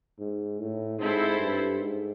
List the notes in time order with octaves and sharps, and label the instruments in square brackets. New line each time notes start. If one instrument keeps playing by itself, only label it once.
[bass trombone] G#2
A2
[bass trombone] G#2 [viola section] C4 E4 A4 C5
[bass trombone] G2
G#2